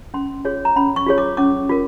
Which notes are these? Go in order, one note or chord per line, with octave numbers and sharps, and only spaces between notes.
C#4 C6
F4 G#4 C#5
A#5
C#4 B5
C#6
F4 G#4 C#5
D6
C#4 D6
F4 A#4